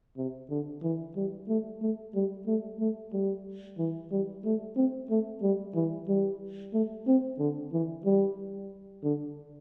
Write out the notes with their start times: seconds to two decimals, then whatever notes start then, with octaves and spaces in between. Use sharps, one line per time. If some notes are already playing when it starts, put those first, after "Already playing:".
0.17 C3
0.50 D3
0.83 E3
1.16 G3
1.48 A3
1.82 A3
2.15 G3
2.47 A3
2.80 A3
3.13 G3
3.78 E3
4.11 G3
4.45 A3
4.76 C4
5.10 A3
5.42 G3
5.75 E3
6.08 G3
6.73 A3
7.07 C4
7.39 D3
7.73 E3
8.05 G3
9.03 D3